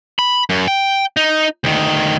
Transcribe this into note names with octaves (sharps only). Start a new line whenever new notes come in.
B5
F#2
G5
D#4
D2 D#3